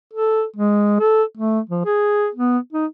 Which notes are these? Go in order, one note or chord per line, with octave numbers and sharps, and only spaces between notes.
A4
G#3
A4
A3
F3
G#4
B3
D#4